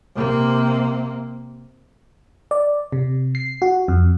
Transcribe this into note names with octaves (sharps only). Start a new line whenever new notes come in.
C3 A#3
D5
C3
C7
F#4
F2